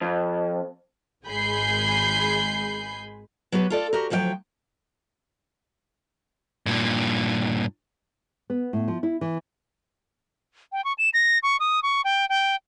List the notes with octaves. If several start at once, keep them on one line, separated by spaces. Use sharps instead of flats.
F2
G#1 G#3 G#5 B5 G6 C7
F#3 B3 G4 B4
F4 A4 D5
F#4 G4 A#4
D2 F3 F#3 E5 G5
G2 A#2
B3
A2
F3
E4
E3
G5
C#6
E7
A#6
C#6
D#6
C#6
G5
G5